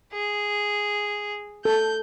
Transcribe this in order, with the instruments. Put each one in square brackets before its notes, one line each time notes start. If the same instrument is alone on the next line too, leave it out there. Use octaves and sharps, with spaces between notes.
[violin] G#4
[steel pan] A4 [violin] G6